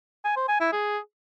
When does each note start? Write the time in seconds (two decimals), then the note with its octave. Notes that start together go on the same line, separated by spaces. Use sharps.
0.24 G#5
0.36 C5
0.48 G#5
0.60 E4
0.72 G#4